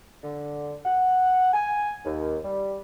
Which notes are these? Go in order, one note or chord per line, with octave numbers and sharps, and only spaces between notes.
D3
F#5
G#5
D#2
G3